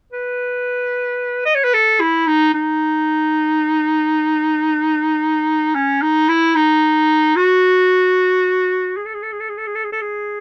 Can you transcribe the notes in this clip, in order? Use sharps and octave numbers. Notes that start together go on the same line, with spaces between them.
B4
D#5
C#5
B4
A4
E4
D#4
D#4
C#4
D#4
E4
D#4
F#4
G#4
A4
G#4
A4
G#4
A4
G#4
A4
G#4
A4
G#4
A4
G#4